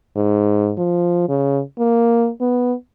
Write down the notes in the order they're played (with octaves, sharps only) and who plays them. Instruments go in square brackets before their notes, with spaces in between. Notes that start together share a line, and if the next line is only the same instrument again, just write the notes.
[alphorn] G#2
F3
C#3
A#3
B3